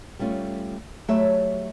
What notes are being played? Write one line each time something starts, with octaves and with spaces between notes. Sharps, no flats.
G3 A3 C#4 F4
F#3 A3 G4 C#5 E5